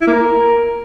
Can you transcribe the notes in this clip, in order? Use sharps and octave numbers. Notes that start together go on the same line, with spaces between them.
E4
A#3
A#4